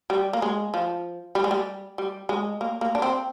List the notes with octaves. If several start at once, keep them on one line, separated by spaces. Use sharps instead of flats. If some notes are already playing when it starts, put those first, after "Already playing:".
G3
A#3
G#3
F3
G3
G#3
G3
G3
G#3
A#3
A#3
D4
C4